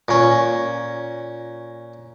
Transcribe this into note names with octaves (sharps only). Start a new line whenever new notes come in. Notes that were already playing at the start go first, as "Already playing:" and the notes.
A#2 C#4